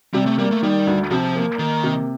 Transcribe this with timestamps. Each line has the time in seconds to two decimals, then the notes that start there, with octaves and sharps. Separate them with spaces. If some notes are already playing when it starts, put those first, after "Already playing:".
0.14 C3 G3
0.26 A3
0.38 G3 A#3
0.51 A3
0.63 D#3 G3
0.87 D2
1.11 C3 F3
1.35 A#3
1.59 D#3 A#3
1.83 C3